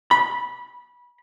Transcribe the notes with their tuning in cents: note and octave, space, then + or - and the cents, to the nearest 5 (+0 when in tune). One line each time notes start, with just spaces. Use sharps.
B5 -20